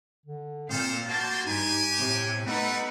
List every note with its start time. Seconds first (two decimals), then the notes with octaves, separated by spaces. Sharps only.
0.26 D3
0.70 A#2 C4 A4 C5 F5
1.08 A#3 F#4 A5 C6 G6
1.46 G2 D#4 G4 G#5
1.99 A2 C3
2.46 G3 A3 B3 D#4 B4 E5 F#5